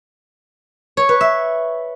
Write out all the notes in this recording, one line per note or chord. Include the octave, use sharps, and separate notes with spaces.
C#5
B4
E5